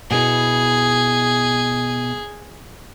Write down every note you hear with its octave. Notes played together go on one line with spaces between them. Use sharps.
B2 B3 E4 G#4